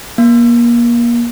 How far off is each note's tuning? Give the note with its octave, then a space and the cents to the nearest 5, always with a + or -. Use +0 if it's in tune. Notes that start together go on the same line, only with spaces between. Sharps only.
A#3 +30